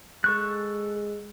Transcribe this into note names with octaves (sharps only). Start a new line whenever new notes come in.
G#3 A4 C#6 F#6